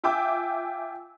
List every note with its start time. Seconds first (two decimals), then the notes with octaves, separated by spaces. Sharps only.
0.04 F4 E5 G5 G#5 D6 E6